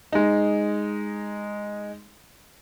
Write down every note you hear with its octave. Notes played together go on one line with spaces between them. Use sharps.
G#3 D#4